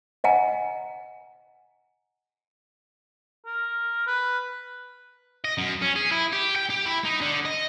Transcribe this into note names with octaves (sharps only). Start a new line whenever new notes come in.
D#5 F#5 G#5 A#5
A#4
B4
D#5
F#2
C#4
G#4
E4
G4
G5
G4
E4
D#4
D3
D#5